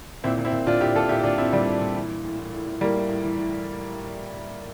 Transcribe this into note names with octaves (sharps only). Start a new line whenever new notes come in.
A#2 C4 E4
A#2
C4 E4
A#2
A#2 D4 F4
A#2 E4 G4
A#2 F4 A4
A#2 E4 G4
A#2 D4 F4
A#2 C4 E4
A#2 G3
A#2
A#2
E3
E3
A2
A2
A2
A2
A2 G3 A#3
A2
A2
E3
A2